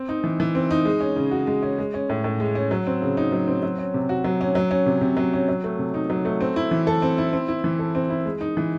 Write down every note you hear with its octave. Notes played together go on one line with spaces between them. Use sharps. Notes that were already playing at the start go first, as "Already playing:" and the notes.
Already playing: C4
D#4
E3
E3
C4
D#4
G#3
C#4
C#3
F#4
G#3
C#4
G#3
C#4
A2
A2
G#3
C#4
F#3
C4
C#3
D#4
F#3
C4
F#3
C#4
C3
F#4
F#3
C#4
F#3
C#4
C3
C3
F#3
C#4
F#3
A3
C3
D#4
F#3
A3
C4
E4
E3
A4
C4
E4
C4
E4
E3
A4
C4
E4
G#3
D#4
E3